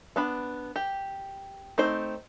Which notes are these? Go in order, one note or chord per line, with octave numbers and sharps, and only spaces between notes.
B3 D4 B5
G4
A3 C4 D#4 C5